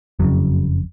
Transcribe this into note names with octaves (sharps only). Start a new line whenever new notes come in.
F#1 F2 C#3 F#3